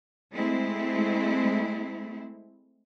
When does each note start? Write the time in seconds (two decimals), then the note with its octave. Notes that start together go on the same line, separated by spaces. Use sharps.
0.32 G#3 A3 C4 E4